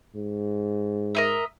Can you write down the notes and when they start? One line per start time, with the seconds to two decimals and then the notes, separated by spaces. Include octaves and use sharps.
0.16 G#2
1.15 A#4 D#5 E5